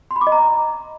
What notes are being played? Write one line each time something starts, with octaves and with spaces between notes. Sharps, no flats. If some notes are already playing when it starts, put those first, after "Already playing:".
C6
B5
D6
D#5
A#5